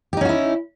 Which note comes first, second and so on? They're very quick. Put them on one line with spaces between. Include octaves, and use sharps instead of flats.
G4 D#4 C#4 F#4 E4